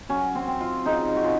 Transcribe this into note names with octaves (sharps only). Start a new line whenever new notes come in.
F#3 C#4
C4
C4
F4
C#3 D#4
F#4
C#3 F4